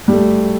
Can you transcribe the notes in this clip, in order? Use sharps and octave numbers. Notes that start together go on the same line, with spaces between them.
G3
A3